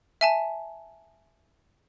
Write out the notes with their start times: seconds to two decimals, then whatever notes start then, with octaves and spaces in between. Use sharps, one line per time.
0.21 E5 G#5 A5